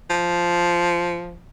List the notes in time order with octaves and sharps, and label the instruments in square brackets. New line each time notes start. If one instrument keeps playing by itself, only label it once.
[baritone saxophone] F3